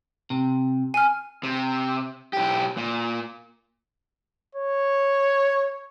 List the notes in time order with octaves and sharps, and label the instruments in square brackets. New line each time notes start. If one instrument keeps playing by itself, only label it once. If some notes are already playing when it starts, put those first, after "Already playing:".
[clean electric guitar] C3
[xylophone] G#5 F6
[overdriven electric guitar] C3
B1 G4
A#2
[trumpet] C#5